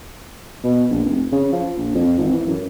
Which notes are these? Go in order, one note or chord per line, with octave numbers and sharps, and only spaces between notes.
B2
A#1
F1
C#3
F3
A#1
F2
G#1
E3
F#2